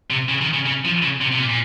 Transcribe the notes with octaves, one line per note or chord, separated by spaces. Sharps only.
C3
C#3
D#3
C#3
C#3
F3
C#3
C3
C3
A#2
A#2